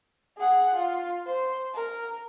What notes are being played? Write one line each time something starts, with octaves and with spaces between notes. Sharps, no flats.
G#4 F#5
F4
C5
A#4